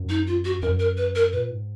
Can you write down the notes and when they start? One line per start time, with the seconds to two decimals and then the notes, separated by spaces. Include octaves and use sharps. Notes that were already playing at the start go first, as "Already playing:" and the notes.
Already playing: F#2
0.09 D#4
0.27 F4
0.45 F#4
0.62 F#2 A#4
0.80 A#4
0.97 B4
1.15 A#4
1.33 A#2 B4
1.50 G#2